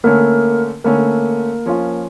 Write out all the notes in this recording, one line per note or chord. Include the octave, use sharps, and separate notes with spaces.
D3 A3 A#3 C#4 A#4
D3 A3 A#3 C#4 A#4
F3 C#4 F4